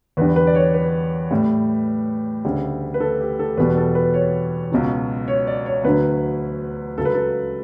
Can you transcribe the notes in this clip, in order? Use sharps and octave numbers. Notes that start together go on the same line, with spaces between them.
E2 D3 G3 B4
B4
D5
C#5
B4
A2 G3
D2 C#3 G3
B4
A4
G4
A4
E2 B2 G3 B4
A4
B4
C#5
C#2 B2 F#3
C#5
D5
C#5
D2 D3 F#3 B4
C#2 C#3 F#3 A4
B4
A4